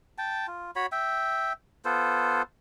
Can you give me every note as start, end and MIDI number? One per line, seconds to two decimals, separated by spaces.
0.18 0.47 79
0.18 0.47 81
0.47 0.71 65
0.76 0.86 66
0.76 0.86 73
0.76 0.86 83
0.92 1.53 76
0.92 1.53 79
1.85 2.42 59
1.85 2.42 65
1.85 2.42 69
1.85 2.42 72